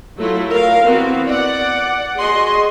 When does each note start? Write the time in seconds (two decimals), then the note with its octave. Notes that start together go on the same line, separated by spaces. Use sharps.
0.18 F#3 A3 E4 F4
0.50 A#4 F5
0.87 E3 B3 C4 F#4
1.27 D5 F#5
2.18 F#4 G#4 D#5 C6